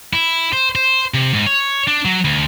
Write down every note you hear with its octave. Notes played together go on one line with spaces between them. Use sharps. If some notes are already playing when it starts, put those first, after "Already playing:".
E4
C5
C5
C3
G#2
C#5
D4
F#3
D2